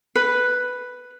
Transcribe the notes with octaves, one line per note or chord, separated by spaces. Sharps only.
B4